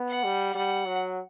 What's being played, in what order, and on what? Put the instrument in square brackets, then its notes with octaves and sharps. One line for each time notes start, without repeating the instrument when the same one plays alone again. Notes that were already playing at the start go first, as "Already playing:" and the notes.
Already playing: [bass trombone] B3
[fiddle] F#5
[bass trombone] G3
[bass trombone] G3 [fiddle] F#5
[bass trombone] F#3